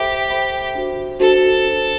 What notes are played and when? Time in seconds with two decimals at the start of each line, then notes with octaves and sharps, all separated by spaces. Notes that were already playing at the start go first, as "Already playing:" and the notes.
Already playing: G4 A4 C5 E5 B5
0.30 A4 C5 E5 B5
0.75 D4 F#4 C5
1.20 D4 F#4 A4 C5
1.65 D4 F#4 C5